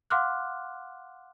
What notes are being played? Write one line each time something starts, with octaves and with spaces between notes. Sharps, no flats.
F5 F#5 C6 D6 F6 F#6